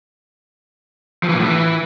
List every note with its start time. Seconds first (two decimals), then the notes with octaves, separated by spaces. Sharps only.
1.23 F3
1.29 E3
1.34 A#2
1.39 A2
1.45 E3